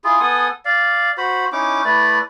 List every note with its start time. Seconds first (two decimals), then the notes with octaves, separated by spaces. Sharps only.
0.04 E4 F4 G#4
0.20 B3 A4 G#5 D#6
0.65 D5 F5
1.18 F#4 C5 B5
1.52 C#4 D#4 E4 D6
1.85 A3 E4 B4 D5